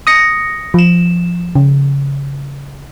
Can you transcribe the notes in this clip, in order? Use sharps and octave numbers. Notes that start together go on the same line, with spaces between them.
D#6 A#6 C#7
F3 E7
C#3